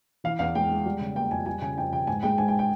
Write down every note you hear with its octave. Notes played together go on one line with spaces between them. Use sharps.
E3 F5
E2 F5
G#3 G5
G#3
G3
C#3
A#3 G5
F2 G#5
G3 G#5
C#3 G#5
F2 G5
C#3 G5
G#2 G#5
G#3 G5
G#2 G#5
G5
G5